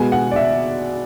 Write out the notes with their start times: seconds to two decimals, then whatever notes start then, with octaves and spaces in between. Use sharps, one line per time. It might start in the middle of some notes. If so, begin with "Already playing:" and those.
Already playing: B2 G#3 B3 G#5
0.12 F#5
0.31 D5
0.36 E5